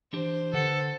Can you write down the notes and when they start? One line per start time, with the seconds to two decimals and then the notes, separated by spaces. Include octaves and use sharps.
0.13 E3 D4 G4 C5
0.53 D3 A4 B4 F#5